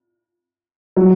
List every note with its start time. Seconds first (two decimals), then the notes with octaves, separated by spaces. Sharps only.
0.96 F#3